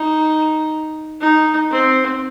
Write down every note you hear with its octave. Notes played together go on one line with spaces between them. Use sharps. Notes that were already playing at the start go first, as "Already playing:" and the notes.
Already playing: D#4
D#4
C4